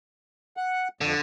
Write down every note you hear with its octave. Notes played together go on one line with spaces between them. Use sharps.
F#5
F2 D3